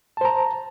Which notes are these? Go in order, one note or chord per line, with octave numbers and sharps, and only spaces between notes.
C5 A5 A#5